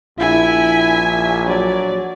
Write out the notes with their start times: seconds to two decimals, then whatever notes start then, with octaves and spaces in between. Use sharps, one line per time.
0.19 A#1 E4 E5 G#5
1.47 F#3 D5